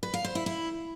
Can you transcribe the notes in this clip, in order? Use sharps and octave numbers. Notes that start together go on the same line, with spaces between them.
B4
F5
C5
E4
E4